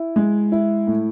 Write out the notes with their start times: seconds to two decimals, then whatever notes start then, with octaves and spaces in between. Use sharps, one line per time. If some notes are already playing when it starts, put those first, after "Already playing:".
Already playing: E4
0.16 G#3
0.52 E4
0.87 A2